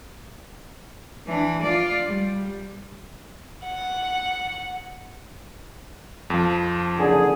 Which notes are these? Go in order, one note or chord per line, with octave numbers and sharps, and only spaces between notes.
E3 D4
F4 D5
G3
F#5
F2 F3
F#1 D3 G#4